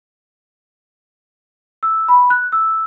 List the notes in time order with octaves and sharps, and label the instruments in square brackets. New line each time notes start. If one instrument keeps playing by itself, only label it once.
[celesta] E6
B5
F#6
E6